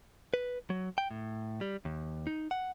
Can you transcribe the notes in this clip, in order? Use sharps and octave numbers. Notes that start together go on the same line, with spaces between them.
B4
F#3
G5
A2
G3
D#2
D#4
F#5